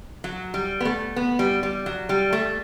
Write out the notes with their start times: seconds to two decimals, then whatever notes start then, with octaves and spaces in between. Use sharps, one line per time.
0.24 F#3
0.54 G3
0.80 B3
0.85 A3
1.16 B3
1.39 G3
1.63 G3
1.86 F#3
2.09 G3
2.33 A3